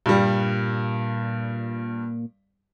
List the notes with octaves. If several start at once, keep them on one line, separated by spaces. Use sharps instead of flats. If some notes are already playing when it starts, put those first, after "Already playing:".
G2 A#2 G3